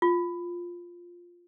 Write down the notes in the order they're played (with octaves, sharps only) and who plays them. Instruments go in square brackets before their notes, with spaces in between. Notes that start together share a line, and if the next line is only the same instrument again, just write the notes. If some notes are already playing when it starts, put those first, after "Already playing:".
[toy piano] F4